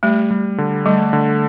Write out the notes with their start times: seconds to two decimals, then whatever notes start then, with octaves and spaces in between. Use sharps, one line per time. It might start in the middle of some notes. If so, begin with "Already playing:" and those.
0.03 G3 A3
0.31 G3
0.58 D3
0.86 G3 A3
1.13 D3